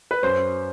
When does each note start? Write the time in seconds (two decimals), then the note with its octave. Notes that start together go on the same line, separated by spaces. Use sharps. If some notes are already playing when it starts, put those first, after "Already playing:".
0.11 B4
0.23 F#2 C5